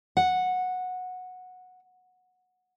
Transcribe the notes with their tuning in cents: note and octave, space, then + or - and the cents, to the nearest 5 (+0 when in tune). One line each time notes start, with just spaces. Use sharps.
F#5 -10